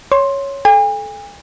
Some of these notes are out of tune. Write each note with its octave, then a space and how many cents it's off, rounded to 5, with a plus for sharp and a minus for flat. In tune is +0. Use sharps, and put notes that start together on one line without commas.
C#5 +0 C6 +10
A4 -25 G#5 -45